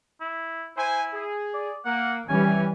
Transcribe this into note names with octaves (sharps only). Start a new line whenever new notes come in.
E4
E4 C5 G#5
G#4
D5
A#3 F#5
E3 G3 C#4 G#5